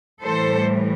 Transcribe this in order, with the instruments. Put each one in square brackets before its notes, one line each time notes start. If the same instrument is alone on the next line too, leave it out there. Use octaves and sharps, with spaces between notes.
[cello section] A2 E3 G3 A4 C5